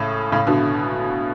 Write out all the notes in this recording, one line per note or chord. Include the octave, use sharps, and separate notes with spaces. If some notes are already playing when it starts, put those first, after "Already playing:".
Already playing: A2 C#3
A2 C#3
B2 D3